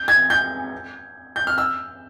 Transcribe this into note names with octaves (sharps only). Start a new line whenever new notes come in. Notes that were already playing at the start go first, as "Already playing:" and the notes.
Already playing: G6
G#6
G6
G6
F6
E6